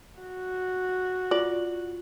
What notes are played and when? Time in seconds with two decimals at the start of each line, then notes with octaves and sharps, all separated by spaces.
0.20 F#4
1.31 F4 D5 F#7